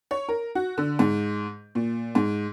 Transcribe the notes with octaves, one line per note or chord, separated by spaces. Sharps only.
C#5
A#4
F#4
D3
G#2
A#2
G#2